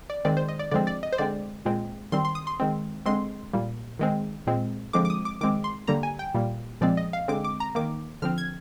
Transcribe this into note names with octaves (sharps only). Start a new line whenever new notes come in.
D5
D#3 G#3 C4 D5
C5
D#5
D5
D3 F3 G#3 C4 D5
D5
D#5
C5
D3 G#3 C4 D5
A#2 G#3 C4
D#3 G3 C4 C6
C6
D#6
C6
D#3 G#3 C4
D3 G#3 C4 C6
A#2 G3 A#3
D#3 G#3 C4
A#2 G#3 C4
D3 F3 G#3 C4 D6
D6
D#6
D6
D#3 G#3 C4 D6
C6
D3 G3 A#3 A#5
G#5
G5
A#2 G3 A#3
A#2 F3 G#3 C4 D5
D#5
F5
D3 G#3 C4 D6
D6
A#5
D#3 A#3 D6
D3 F3 C4 F6
G#6